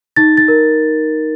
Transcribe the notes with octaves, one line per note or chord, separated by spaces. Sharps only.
D#4 A6
A6
A#4